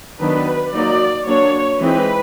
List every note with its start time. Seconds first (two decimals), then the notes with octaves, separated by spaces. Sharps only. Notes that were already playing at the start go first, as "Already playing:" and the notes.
0.21 D#3 F#3 B3 D4 B4
0.73 F#3 A#3 D#4 D5
1.27 F#3 A#3 D4 C#5
1.79 E3 G#3 C4 D#4 B4